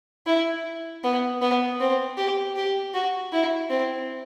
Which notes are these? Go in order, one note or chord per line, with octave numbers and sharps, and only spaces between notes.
E4
B3
B3
C4
G4
G4
F#4
E4
C4